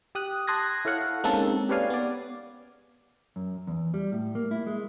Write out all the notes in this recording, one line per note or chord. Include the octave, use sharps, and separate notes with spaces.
G4 D#6 F#6
A5 C6 D#6 F#6 G#6 A#6
E4 A4 C#5 F5 F#5
G#3 A#3 C4 C#4 D#4 A4
G4 B4 C#5 D5 F5 G#5
B3 D5
F#2
E2
G3
A2
A#3
E4
G#3